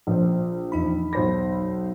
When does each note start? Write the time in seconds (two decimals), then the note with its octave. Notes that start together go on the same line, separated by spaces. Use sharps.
0.07 A#1 C5
0.72 E2 D#4 B5
1.13 B1 C5 A#6